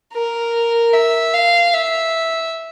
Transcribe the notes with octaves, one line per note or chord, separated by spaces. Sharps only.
A#4
E5
F5
E5